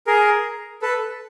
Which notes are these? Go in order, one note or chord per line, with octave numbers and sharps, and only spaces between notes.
G#4 A#4
A4 B4